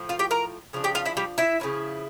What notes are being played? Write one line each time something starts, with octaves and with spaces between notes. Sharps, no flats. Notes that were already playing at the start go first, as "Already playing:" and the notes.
Already playing: A2 F3
F4 F5
G4 G5
A#4 A#5
C#3 F3 D4
G4 G5
F4 F5
E4 E5
G3 G4
E4 E5
C#3 F3 C#4 E4